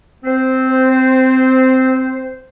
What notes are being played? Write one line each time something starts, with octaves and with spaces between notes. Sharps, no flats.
C4 C5